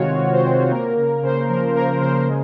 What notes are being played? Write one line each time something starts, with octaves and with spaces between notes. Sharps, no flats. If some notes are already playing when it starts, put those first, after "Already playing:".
Already playing: C3 D#3 G#3 C4 F4 F#4 C#5
G#3
C5
C4
C5
A#3 A#4
C#3
C#3 C5
F3 A#4
A#3 A#4
C#3 C5
G#3